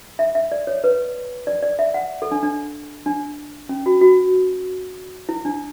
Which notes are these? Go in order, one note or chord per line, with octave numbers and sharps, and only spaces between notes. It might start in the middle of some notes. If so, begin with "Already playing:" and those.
E5
E5
D5
C#5
B4
D5
D5
E5
F#5
A4
D4
D4
D4
C#4
F#4
F#4
E4
D4